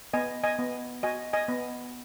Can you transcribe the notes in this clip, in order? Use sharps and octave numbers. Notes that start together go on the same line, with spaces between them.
B3 D#5 G#5
D#5 G#5
B3
F#4 D#5 G#5
D#5 G#5
B3